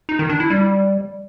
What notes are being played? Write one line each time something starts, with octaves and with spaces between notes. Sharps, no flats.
D#4
D#3
D4
E4
G3